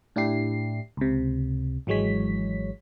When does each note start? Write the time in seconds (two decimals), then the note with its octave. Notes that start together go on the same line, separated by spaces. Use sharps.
0.16 A2 D4 E4 G4 C7
0.97 C#2 C3
1.87 G#1 E3 F#3 G#3 C#5 B6